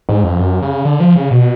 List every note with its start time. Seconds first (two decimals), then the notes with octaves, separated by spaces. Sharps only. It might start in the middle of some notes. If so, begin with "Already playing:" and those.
0.09 G#2
0.24 F2
0.39 F#2
0.62 C#3
0.85 D3
1.00 F3
1.15 C#3
1.31 B2